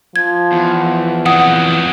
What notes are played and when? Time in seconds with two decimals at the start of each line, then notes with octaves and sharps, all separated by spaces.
0.16 F3 G#6
0.52 E2
1.26 F2 F#3 F#5 D#6